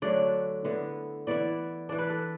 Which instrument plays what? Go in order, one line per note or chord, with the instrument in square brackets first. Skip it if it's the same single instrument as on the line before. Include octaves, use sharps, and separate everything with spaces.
[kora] D3 F#3 A3 D4 D5
D3 B3 E4
E3 B3 E4 D5
E3 D4 D5
B4
A4